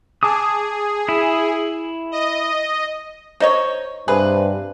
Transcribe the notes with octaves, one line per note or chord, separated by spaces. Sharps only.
G#4 A5 D6 D#6
E4
D#5
D#4 C5 C#5 D#5
G2 C3 G#4 B4